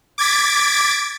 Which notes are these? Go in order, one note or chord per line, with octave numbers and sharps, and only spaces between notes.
D6 G#6 A6 B6 D7